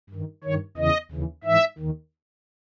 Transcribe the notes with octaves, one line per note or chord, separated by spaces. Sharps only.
G2 D#3
G2 D#3 C#5
E2 C#3 E3 D#5
D#2 C#3 E3
G#2 E3 E5
D#2 D#3